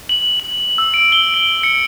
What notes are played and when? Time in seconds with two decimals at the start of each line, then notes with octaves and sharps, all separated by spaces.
0.09 F#7
0.40 F#7
0.78 E6
0.94 D7
1.12 G7
1.34 D7
1.63 C#7